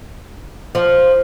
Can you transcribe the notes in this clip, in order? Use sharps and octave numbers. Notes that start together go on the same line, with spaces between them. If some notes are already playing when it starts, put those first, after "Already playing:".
F3